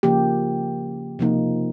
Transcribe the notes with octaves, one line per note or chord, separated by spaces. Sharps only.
C#3 F3 A#3 G4
C3 F3 A#3 D#4